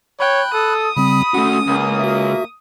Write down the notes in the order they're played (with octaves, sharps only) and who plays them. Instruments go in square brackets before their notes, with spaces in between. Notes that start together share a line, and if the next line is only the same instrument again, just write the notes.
[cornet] C#5 [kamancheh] G5 [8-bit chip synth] B5 F#6
[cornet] A4 [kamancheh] D#6
[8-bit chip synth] C#3 G3 C4 [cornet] B5
[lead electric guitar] A3 F#4 [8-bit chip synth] C#4
[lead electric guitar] C#2 [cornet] A#3
[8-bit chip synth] F#4 E5